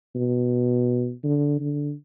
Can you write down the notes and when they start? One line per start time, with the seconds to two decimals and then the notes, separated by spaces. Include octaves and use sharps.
0.15 B2
1.23 D3
1.60 D3